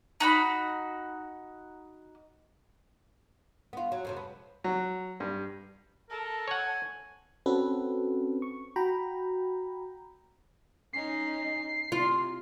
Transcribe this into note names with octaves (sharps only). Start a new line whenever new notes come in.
D#4 F#4 B5
B3 F4
F#3
F2 C3 F#3
B3
F#3
G2
A4 A#4
C#5 F#5 G#5
C4 C#4 F#4 A4 B4
C#6
F#4 G5 A#5 B5
C#4 D#4 C7
C3 F4